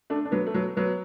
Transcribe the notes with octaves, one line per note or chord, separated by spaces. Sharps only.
A3 D4
D4
F#3 B3
A3
F#3 B3
F#3 B3